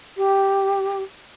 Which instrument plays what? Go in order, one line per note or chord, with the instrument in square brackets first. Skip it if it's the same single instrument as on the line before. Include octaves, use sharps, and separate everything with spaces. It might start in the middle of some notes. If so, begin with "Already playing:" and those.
[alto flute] G4